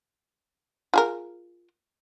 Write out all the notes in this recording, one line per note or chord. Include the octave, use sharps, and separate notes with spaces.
F4 G#4 A#4